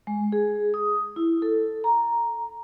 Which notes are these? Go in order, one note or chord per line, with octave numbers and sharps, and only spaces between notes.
G#3
G#4
D#6
E4
A4
A#5